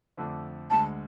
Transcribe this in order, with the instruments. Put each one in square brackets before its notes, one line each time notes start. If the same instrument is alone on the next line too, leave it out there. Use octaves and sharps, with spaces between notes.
[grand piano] F2 D3 A3 D4
[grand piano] D2 D3 G#3 [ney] A5